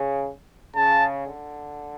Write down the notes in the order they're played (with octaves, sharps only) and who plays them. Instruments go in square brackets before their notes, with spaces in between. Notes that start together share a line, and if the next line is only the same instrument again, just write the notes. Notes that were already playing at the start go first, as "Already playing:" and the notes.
Already playing: [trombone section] C#3
[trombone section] C#3 [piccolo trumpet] A5
[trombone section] D3